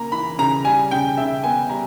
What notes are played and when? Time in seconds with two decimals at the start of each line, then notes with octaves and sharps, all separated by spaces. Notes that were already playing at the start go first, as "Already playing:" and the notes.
Already playing: C#3 A#3 A#5
0.12 E3 B5
0.38 C#3 A#5
0.65 G3 G#5
0.91 C#3 G5
1.17 C#3 E5
1.44 B3 G#5
1.70 G3 A#5